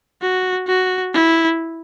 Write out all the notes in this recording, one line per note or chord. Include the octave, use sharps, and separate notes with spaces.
F#4
F#4
E4